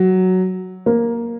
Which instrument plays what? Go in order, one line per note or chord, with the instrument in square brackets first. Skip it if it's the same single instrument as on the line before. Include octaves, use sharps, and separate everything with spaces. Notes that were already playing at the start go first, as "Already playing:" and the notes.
Already playing: [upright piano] F#3
A#3